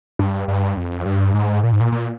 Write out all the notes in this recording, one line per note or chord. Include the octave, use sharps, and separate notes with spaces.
G2
G2
F2
G2
G#2
A#2
G#2
A#2
A#2